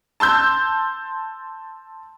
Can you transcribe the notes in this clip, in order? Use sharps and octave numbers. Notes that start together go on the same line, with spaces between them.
A5 C6 E6 G6